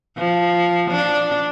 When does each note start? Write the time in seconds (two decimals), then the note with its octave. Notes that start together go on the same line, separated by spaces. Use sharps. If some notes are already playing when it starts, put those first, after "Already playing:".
0.17 F3
0.91 D4